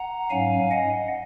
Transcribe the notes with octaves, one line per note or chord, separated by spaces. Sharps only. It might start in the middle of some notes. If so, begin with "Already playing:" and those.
Already playing: F#5 A#5
G#2 F#3 C#4 F5 G#5
D#5 F#5